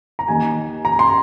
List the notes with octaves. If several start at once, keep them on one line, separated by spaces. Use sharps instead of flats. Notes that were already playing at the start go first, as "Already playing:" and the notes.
A#5
D#2 D#3 G#5
A#5
C6